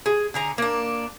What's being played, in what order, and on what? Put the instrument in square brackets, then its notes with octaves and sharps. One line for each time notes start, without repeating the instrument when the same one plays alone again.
[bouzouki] G#4
D3 G#4 A#5
A#3 D4